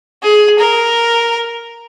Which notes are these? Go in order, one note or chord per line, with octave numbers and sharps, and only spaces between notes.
G#4
A#4